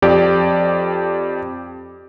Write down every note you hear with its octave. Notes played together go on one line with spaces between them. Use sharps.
F2 G4 D5